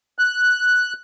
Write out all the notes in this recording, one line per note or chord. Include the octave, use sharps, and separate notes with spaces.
F#6